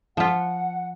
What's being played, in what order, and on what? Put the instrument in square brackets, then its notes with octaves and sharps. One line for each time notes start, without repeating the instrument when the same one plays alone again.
[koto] F3 F4 [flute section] F#5